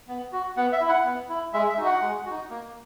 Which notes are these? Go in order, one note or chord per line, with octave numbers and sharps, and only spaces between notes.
B3
F#4
B3 F#5
E5
E4
F#5
B3
E4
G#3 E5
E5
D#4 F#4
F#5
G#3
D#4 F#4
A#3